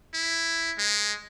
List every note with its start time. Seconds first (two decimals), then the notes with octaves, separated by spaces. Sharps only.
0.14 E4
0.78 G#3